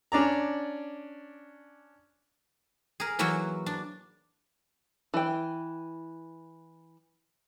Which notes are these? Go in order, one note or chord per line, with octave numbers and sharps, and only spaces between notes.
C#4 D4 D5 A#5
G#4 A#4
E3 F#3 A#3 E4 F#4
D4
E3 G5